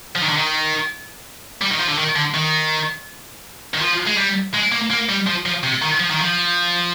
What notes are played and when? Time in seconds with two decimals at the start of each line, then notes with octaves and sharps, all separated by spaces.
0.15 F3
0.22 D#3
0.29 D3
0.37 D#3
1.62 G3
1.71 D#3
1.80 F3
1.89 D3
1.98 D#3
2.16 D3
2.34 D#3
3.74 D#3
3.81 F3
4.06 G#3
4.17 G3
4.54 G#3
4.72 A#3
4.91 A#3
5.09 G3
5.26 F3
5.46 F3
5.63 C3
5.82 D#3
6.00 F3
6.11 D#3
6.21 F3